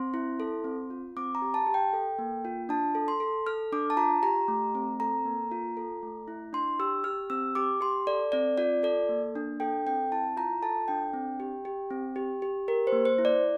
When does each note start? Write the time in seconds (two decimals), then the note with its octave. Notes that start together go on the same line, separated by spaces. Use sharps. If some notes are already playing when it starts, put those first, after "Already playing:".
Already playing: C4 C6
0.14 E4
0.40 A4
0.64 C4
0.90 F4
1.16 C4 D6
1.35 A#5
1.42 G4
1.54 A5
1.67 G4
1.74 G5
1.93 A4
2.19 A#3
2.45 F4
2.69 D4 A5
2.95 A4
3.08 C6
3.20 A4
3.46 A4 F6
3.72 D4 D6
3.90 A5
3.97 F4 A#5
4.23 G4 A#5
4.48 A3
4.75 C4
5.00 A4 A#5
5.25 A#3
5.51 F4
5.77 A4
6.03 A3
6.28 E4
6.53 D4 C6
6.80 G4 E6
7.04 G4 F6
7.30 C4 E6
7.55 G4 D6
7.81 G4 C6
8.07 A4 D5
8.32 C4 D5
8.58 F4 D5
8.83 A4 D5
9.09 A#3
9.35 D4
9.60 A4 G5
9.87 C4 G5
10.12 E4 A5
10.37 F4 A#5
10.62 A4 A5
10.88 D4 G5
11.13 C4
11.40 G4
11.65 G4
11.91 C4
12.16 G4
12.42 G4
12.68 G4 A#4
12.87 C5
12.93 A#3
13.05 C5
13.18 E4
13.25 D5